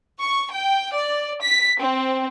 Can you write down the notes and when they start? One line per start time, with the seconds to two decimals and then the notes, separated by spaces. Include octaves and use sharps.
0.21 C#6
0.53 G5
0.94 D5
1.41 B6
1.80 C4